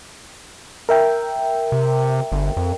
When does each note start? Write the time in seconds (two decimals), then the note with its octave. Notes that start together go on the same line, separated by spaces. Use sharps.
0.89 A#4 E5 G5
1.72 C3
2.32 G1
2.57 F2